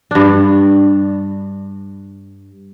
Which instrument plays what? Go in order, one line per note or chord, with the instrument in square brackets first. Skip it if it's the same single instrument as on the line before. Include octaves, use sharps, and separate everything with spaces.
[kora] G2 D4